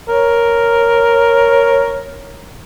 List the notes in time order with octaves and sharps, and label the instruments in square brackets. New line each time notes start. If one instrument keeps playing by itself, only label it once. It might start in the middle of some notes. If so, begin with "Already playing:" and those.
[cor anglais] A#4 [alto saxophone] C#5